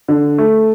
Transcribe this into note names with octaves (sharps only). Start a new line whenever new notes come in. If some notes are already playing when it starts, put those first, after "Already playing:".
D3
A3